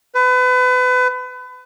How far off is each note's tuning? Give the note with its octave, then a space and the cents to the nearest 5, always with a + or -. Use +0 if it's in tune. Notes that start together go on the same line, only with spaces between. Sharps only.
B4 +30